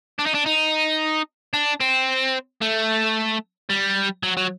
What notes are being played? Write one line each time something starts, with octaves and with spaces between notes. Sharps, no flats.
D4
D#4
D4
D#4
D4
C4
A3
G3
F#3
F#3